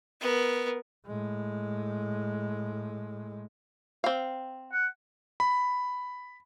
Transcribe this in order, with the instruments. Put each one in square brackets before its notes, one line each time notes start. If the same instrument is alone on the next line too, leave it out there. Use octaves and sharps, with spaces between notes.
[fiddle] B3 A#4
[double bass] A2 G#3
[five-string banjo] C4 F5
[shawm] F#5
[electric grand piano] B5